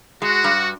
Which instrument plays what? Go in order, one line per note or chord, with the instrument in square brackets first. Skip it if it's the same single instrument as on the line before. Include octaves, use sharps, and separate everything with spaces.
[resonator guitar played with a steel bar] G#3 [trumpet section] F#4
[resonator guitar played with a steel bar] G2